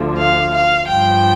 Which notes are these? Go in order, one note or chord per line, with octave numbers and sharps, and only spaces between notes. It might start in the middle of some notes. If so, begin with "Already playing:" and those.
Already playing: D2 D3 F3
F5
F5
G2 F3 G5